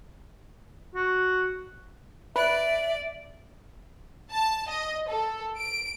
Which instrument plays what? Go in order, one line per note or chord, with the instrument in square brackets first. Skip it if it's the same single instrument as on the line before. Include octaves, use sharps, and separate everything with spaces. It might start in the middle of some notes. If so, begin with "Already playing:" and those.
[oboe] F#4
[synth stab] B4 F#6 [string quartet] D5 [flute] E5
[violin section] A5
D#5
A4
D7